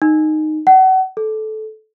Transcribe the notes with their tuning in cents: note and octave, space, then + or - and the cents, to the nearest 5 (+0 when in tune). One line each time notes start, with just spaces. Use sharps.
D#4 -10
F#5 +30
A4 -20